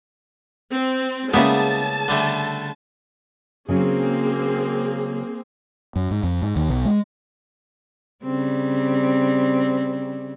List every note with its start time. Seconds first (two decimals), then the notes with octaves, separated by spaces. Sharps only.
0.71 C4
1.33 C#3 G3 G#3 A#3 B3 E4 G#4 A5
2.08 D3 G3 A3
3.68 C#3 F#3 A#3 C4 C#4 G#4
5.96 F#2
6.11 G#2
6.23 F2
6.42 G#2
6.56 D#2
6.69 B1
6.85 G#3
8.23 C#3 G3 C4